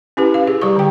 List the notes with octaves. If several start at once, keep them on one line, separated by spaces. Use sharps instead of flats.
C#4 E4 G4 B4
F5
G#4
G3 G4 C#6
D3 G5